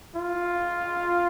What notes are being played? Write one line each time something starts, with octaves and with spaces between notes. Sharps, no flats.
F4